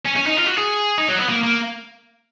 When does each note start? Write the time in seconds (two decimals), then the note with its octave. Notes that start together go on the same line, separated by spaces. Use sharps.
0.06 C#4
0.16 C#4
0.27 D#4
0.37 F4
0.47 F#4
0.57 G#4
0.98 D#4
1.08 F#3
1.19 B3
1.29 A#3
1.44 A#3